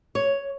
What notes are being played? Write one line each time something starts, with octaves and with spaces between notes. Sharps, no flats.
C#5